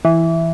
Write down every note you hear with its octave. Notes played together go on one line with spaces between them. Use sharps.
E3